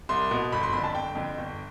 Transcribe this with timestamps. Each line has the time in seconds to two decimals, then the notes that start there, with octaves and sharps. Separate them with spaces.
0.09 C2 C6
0.31 B2 B3
0.52 G1 B5
0.63 C6
0.73 F2 B5
0.77 D3
0.84 A5
0.95 G1 G5
1.15 F2 D3
1.38 G1